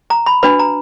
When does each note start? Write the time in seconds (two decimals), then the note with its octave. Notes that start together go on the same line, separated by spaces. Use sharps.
0.10 A#5
0.26 B5
0.43 D4 F#4 B4 B5
0.59 A#5